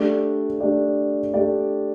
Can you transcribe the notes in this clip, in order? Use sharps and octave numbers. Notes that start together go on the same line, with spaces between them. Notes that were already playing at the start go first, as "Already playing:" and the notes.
Already playing: A3 D4 G4 D5
A3 D4 G4 D5
A3 D4 G4 D5